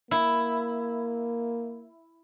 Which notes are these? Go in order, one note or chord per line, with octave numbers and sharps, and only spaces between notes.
A#3 E4